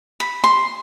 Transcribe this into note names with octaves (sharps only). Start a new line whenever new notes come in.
B5
C6